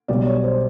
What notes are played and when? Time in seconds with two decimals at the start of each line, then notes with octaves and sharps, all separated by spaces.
0.08 B1 B2 G3 D5
0.26 C#5
0.44 C5